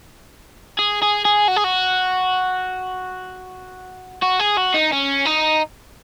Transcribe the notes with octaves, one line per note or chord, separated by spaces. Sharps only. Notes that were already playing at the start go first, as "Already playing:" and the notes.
G#4
G#4
G#4
F#4
G#4
F#4
F#4
G#4
F#4
D#4
C#4
D#4